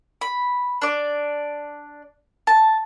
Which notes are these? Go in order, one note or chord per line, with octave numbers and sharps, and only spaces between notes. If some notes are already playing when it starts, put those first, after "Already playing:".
B5
D4 D5
A5